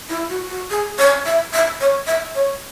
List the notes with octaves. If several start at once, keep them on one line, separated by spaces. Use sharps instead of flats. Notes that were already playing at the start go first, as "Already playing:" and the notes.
E4
F#4
F#4
G#4
C#5
E5
E5
C#5
E5
C#5